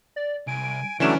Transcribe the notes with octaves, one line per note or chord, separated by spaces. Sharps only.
D5
C2 G#5 D7
C#2 D3 E3 F#3 A3 C#4 D4 E7